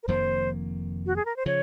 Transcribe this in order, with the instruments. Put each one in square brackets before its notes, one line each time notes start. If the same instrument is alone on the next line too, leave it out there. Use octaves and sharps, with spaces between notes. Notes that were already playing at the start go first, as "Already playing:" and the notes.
[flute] A#4
[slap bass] F1 F2 D#3 A#3 [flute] C5
[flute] F#4
G#4
A#4
C5
[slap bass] C#3 F3 [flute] C#5